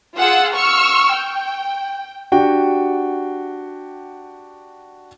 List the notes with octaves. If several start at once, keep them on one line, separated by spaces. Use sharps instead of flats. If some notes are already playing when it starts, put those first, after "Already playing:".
F4 G#4 F#5 E6
C#6 E6 F6
G5
D4 F#4 G4 F#5 G5